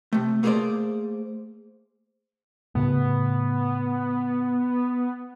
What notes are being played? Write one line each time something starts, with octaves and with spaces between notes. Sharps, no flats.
C3 A3
A3 A#3 G#4 A4 C5 D5
A2 C#3 A3 B3